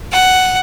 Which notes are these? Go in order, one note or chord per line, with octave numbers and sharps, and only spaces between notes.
F#5